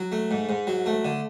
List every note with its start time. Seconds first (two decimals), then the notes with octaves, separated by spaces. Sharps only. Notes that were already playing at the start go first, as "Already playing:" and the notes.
Already playing: F#3
0.12 A3
0.31 G#2
0.49 G#2
0.67 F#3
0.86 A3
1.05 D3